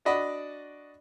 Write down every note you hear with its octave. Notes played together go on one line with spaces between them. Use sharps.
D4 F#4 D5 D#5 B5